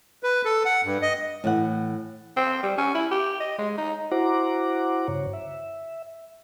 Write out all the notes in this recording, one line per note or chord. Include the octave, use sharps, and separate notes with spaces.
B4
A4
F#5
G2
D#5
A2 E3 F#5
C4
G3
C#4
E4
G4
D#5
G#3
D#4
E4 F#4 C5 F#5 A#5 D6
G2 C#3 C#5
E5